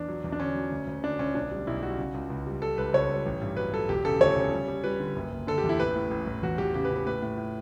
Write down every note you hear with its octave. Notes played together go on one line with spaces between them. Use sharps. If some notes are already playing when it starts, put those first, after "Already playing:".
Already playing: E2 D4
F#3
E2
D4
D3 C#4
F#3
D2
D2
D3 D4
D2 C#4
B1 D4
G3
B1 E4
G3 F#4
C#3
C#2
C#2
G3
G3 A4
C#2 B4
C#2 C#5
G3
A1
G2
F#3 B4
F#3 A4
E1 G4
C#3 A4
D2 C#5
C#3
G3
G3
G3 B4
D3
F#1
F#1
D3 A4
G4
E2
E4
A1 B4
A2
A1
A1
E2 F#4
E2 G4
C#3 G4
B4
C#3
B4
A2 B4
A2
A2